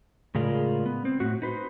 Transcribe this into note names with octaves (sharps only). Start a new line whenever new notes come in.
A2 C#3 G#3 F4 A#4 D5
B3
C4
A2 F#4
D#4 B4 C5